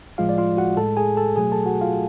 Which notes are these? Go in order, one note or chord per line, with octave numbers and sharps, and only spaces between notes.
A2 F3 G#3 F4 F5
D5
F4 F5
F#4 F#5
A2 G#3 A4 A5
G#4 G#5
A4 A5
B2 F#3 A3 G#4 G#5
A4 A5
F#4 F#5
F4 F5